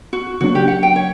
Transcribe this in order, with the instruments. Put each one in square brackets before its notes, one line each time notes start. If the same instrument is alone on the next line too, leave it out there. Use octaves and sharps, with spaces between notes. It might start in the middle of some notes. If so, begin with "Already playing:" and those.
[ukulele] F#4
[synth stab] C#3 F#3 A#3 D4 [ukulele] F#4
[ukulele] G4
F#5
G5
C#5